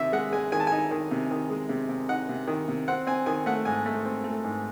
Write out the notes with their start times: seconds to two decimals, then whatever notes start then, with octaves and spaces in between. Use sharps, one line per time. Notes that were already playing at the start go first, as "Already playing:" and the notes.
Already playing: C3 D#3 E5
0.12 G#3 F#5
0.32 G#3 G#5
0.52 D#3 G#5
0.60 A5
0.67 D#4 G#5
0.91 D#3
1.11 C3
1.31 D#3
1.50 G#3
1.69 C3
1.89 C3
2.09 D#4 F#5
2.29 C3
2.48 D#3
2.68 C3
2.88 C4 F#5
3.07 C4 G#5
3.26 D#3 G#5
3.46 A3 F#5
3.65 G#2 G#5
3.86 A3
4.05 C4
4.24 A3
4.44 G#2